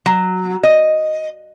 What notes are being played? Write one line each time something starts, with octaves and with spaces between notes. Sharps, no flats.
F#3
D#5